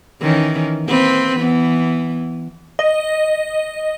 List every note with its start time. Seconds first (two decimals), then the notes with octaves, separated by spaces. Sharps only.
0.21 D#3 E3 C#4
0.86 A#3 C4 B4
1.38 E3 B3
2.79 D#5